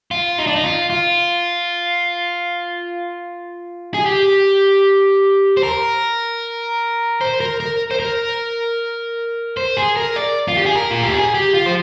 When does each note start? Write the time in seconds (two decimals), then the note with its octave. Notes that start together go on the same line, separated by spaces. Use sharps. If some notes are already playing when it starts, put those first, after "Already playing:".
0.11 F4
0.38 D#4
0.47 D4
0.56 D#4
0.64 F4
0.90 F4
3.94 G#4
4.06 G4
5.57 C5
5.63 A#4
7.21 C5
7.40 A#4
7.60 A#4
7.91 C5
8.00 A#4
9.57 C5
9.77 G#4
9.97 A#4
10.16 D5
10.48 F4
10.57 G4
10.66 G#4
10.75 A#4
10.91 F4
11.03 G4
11.14 G#4
11.34 G4
11.54 F4
11.66 C5